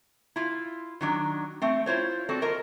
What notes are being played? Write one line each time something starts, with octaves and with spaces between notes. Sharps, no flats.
E4 F4
D#3 F#3 D4
A3 C4
E4 F4 C5 C#5
C4 F#4 A4 D5
F4 A#4 D#5